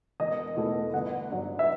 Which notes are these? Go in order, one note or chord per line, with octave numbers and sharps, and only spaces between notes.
E1 D#5
E2 B2 A3 E4
G1 F#5
G2 F#3
E5